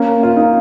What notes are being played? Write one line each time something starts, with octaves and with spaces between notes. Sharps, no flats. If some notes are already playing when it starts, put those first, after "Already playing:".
Already playing: A#3 C#4
F4
D#4